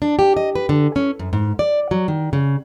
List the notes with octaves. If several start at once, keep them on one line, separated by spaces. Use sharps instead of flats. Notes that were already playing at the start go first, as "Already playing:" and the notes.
D4
G4
D#5
B4
D3
C#4
F#2
G#2
D5
F#3
D#3
C#3